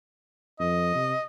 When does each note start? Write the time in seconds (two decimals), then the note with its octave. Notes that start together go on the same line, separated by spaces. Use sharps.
0.60 F2 D#5
0.95 C3